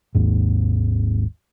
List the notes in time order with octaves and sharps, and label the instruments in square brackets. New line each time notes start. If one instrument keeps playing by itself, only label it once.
[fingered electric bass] G#1 D#2 G#2